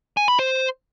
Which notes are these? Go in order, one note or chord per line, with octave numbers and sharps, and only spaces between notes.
G#5
B5
C5